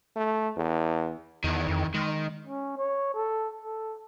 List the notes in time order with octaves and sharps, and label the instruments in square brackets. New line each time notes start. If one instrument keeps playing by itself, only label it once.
[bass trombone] A3
E2
[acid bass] E2 [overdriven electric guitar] D#3 E3
[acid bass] F2
[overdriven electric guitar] D#3 [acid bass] G#3
[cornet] C#4
C#5
A4
A4